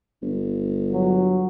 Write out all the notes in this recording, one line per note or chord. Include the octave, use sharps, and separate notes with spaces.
G1
F#3